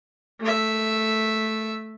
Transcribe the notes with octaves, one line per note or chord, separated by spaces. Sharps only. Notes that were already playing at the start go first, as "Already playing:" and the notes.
A3 E5